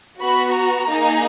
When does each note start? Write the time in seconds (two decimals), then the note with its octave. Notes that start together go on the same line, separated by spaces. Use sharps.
0.20 B3 F#4 B5
0.54 A#5
0.88 A#3 D#4 G#4